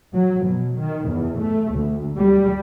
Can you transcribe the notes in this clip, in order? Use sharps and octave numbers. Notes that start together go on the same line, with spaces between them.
F#3
B2
D#3
E2
A3
D2
G3